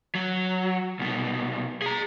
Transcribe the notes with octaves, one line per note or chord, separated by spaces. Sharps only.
F#3
C2 B2
G#4 A#5